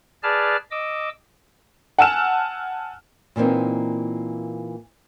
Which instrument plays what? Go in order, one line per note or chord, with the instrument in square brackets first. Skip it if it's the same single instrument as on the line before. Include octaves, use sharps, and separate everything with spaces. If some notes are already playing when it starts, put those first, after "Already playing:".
[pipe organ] G#4 B4 D5 A5 F6
D#5 D6 E6
[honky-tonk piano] F#5 G#5 A5 E6 F6 E7
[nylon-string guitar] A#2 E3 A#3 C4 D#4